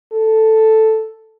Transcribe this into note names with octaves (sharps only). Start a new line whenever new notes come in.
A4